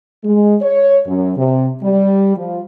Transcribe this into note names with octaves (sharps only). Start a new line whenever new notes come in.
G#3
C#5
F#2
C3
G3
F3